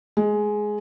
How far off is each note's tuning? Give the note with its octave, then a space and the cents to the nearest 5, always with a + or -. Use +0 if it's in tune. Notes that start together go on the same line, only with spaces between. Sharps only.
G#3 +10